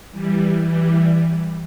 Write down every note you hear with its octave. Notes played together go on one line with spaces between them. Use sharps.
E3 G3
E3 G3